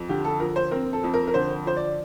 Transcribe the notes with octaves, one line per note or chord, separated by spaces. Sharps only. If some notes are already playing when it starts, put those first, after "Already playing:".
Already playing: F2
D3 G4
A4
F3 A#4
C5
C4 A#4
A4
F2
A#4
A#4
D3 C5
F3 C5
D5